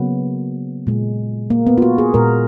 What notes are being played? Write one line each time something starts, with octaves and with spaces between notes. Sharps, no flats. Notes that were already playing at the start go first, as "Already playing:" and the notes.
Already playing: C#3 F#3 A#3 B3
A#2 G#3
A#3
B3
F4
F#4
G#4
A#2 G#3 A#4